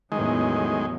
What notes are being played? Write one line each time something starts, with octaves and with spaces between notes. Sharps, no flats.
A1 E2 D#3 F#3 G#3